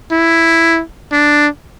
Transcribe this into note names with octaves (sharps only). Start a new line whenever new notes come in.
E4
D4